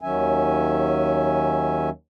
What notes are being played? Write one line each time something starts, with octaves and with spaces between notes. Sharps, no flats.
D#2 D#3 F#3 C#4 E5 G#5